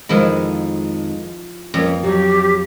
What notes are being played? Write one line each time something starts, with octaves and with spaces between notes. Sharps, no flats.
F2 D#3 F3 G#3 E4
F2 A#3 C#4
F#3 G4